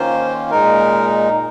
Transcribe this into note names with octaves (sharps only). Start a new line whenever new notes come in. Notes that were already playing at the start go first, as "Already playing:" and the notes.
Already playing: D#3 A#3 C#4 F4 C5
A#2 G#3 D#4 A#4